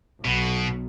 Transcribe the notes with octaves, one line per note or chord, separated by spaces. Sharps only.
B1 B2